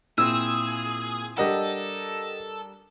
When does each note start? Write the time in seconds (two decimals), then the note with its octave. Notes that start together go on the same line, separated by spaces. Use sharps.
0.18 A#2 C4 E4 G#4 E6
1.38 G3 D4 G4 A4 A#4 D#5 F#5